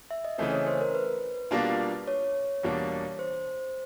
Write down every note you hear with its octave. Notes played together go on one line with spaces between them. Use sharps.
E5
D#5
C#3 E3 A3 C4 D#5
C#5
C5
A#4
B4
B2 G3 A#3 D4 F4
C#5
E2 B2 G3 A#3 D4
C5